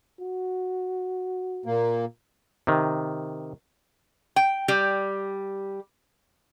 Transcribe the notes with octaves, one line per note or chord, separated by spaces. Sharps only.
F#4
A#2 A#3
C3 D#3
G5
G3 G4